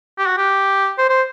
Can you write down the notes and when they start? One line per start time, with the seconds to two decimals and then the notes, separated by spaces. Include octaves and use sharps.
0.18 G4
0.27 F#4
0.37 G4
0.98 C5
1.09 C5